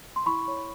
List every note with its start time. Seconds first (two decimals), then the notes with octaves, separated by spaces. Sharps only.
0.16 C6
0.26 E4 B5 C#6
0.48 C#5